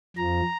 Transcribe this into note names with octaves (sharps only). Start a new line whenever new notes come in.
F2 F3 A#5